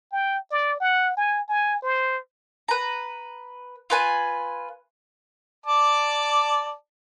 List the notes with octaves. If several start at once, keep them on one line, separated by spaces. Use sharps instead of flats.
G5
D5
F#5
G#5
G#5
C5
B4 A#5
F4 B4 G#5
D5 A5 D6